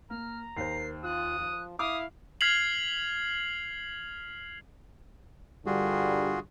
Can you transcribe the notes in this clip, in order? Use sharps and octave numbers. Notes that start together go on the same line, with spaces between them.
A#3 A#5 F6
D#2 A#4 C5 C7
F4 D#6 F#6
F3
E4 F5 D6 D#6
F6 G#6 B6 C7 F7 F#7
G2 D3 G3 F4 F#4 G#4